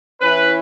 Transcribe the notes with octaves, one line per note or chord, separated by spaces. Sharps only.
E3 C#4 E4 B4